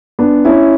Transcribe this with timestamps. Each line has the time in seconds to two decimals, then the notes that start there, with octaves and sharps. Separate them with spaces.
0.19 B3 D4
0.45 C#4 E4